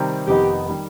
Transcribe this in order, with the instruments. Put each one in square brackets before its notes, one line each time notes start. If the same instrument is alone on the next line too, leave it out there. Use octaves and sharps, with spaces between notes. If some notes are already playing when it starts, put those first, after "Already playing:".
Already playing: [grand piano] C3 D#3 G3 C4
[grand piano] F1 F2 D#3 B3 D#4 [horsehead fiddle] G4
[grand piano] D#3 G3